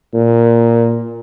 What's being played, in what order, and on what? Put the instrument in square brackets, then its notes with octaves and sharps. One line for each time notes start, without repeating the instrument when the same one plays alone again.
[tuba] A#2